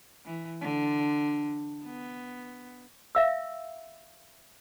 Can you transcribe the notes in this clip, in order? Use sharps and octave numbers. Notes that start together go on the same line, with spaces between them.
E3
D3
B3
E5 F5 E6